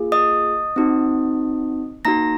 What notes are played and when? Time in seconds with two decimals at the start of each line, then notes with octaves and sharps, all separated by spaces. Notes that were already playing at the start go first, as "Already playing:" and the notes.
Already playing: A#3 F4 G#4
0.12 D#5 D#6
0.76 C4 D#4 F#4
2.05 A#3 D#4 F#4 A#5 A#6